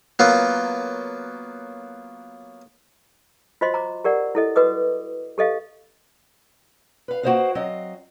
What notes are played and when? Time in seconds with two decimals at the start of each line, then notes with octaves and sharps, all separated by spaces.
0.19 F#3 A#3 B3 F4
3.61 F4 F#4 C5 D#5 C6
3.74 A#5 D6
4.04 G4 A#4 D5 F#5
4.35 E4 A4 D#5
4.56 F#4 B4 D#5 D6 D#6
5.38 G4 A4 D#5 F5
7.08 B4 F5
7.23 A#3 F#4 B4 C5 D#5 F5
7.55 F#3 C4 D#5 F5